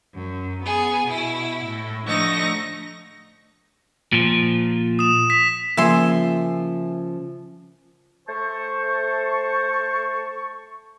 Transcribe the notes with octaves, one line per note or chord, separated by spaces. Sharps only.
F#2
B3 G#4
B2 E4
A2
D3 F3 A3 D#4 C#6 A#6
A#2 F3
D#6 E7
B6
C#3 F3 A#3 E5 G#5 C6
A3 C5 A5 C#6